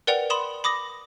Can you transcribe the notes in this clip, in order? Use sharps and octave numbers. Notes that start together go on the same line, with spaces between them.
A#4 B4 D5 F#5 G5 F7
B5 C6 D#6 E7
B5 D6 D#6 A#6